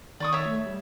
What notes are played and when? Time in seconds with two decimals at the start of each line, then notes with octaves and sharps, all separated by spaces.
0.20 D#3 D5 C#6 D#6
0.33 C#5 E5
0.46 A3
0.66 G3